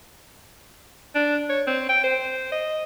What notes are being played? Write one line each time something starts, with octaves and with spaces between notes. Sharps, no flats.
D4
C#5
C4
G5
C5
D#5